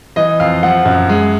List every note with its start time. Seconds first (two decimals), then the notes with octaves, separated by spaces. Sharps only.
0.16 E3 D#5
0.40 F2 F5
0.63 F3 F#5
0.85 F#2
1.09 G#3